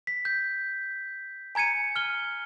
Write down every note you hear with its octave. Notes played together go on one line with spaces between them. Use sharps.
B6
G6
G#5 A#5 G#6 C#7 D#7
F6 G7